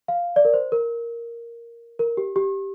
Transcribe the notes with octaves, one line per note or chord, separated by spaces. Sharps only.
F5
D5
A#4
C5
A#4
A#4
G4
G4